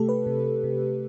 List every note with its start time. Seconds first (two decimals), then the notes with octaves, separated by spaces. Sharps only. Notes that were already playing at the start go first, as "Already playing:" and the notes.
Already playing: C3 A3 G4 A4
0.09 B4
0.27 C3
0.64 C3